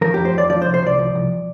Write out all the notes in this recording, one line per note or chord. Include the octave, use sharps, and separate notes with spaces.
F3 A#4
F2 G4
C5
F2 D5
F3 D5
C5
C2
C5
C2 D5
F3
C2